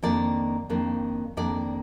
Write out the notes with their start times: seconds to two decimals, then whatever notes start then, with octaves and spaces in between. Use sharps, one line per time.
0.03 F2 D#3 A#3 D4 D5
0.70 F2 D#3 A#3 D4
1.37 F2 D#3 A#3 D4 D5